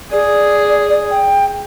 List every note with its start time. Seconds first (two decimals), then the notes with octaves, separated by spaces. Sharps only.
0.12 G#4 D5
1.11 G5